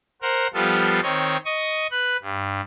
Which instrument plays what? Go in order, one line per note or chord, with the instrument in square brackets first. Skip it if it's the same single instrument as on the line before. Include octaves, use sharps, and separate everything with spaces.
[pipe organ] A#4 C5 F#5
F3 G3 B3 F4 A4
D#3 C4 C#5 D#5
D#5 C#6 D#6
B4 F#6
G2